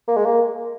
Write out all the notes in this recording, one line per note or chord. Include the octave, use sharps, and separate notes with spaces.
A#3
G#3
A#3